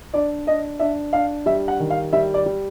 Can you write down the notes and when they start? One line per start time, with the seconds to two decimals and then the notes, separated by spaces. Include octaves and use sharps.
0.13 D4 D5
0.47 D4 D#5
0.79 D4 E5
1.13 D4 F5
1.46 G3 E5
1.68 F#5
1.80 D#3
1.90 F5
2.13 G3 E5
2.34 D5
2.46 G3